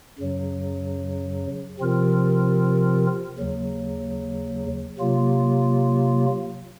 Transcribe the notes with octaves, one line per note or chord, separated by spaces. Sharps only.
F#2 C#3 F#3
C3 F3 C4 F4 A#4
D#2 C#3 F#3
C3 F#3 A#3 F4